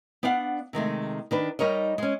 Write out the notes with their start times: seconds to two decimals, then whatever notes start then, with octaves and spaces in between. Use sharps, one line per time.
0.23 B3 D4 D5 F5 F#5
0.73 C3 D#3 G#3 A3
1.31 D#3 D4 B4
1.59 G3 D#4 A#4 C#5 D#5
1.98 G#3 C#4